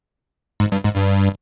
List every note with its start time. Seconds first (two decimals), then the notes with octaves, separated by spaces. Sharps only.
0.60 G#2
0.72 G2
0.84 G#2
0.96 G2